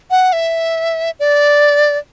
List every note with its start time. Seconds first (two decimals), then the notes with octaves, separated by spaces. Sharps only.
0.10 F#5
0.33 E5
1.19 D5